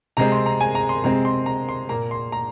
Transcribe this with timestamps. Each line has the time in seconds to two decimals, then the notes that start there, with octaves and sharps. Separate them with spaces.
0.17 C3 G#3 C4 A#5
0.32 C6
0.46 A#5
0.60 G#5
0.75 A#5
0.89 C6
1.04 C3 G#3 C4 A#5
1.25 C6
1.46 A#5
1.69 C6
1.89 A#2 A#3 A#5
2.11 C6
2.32 A#5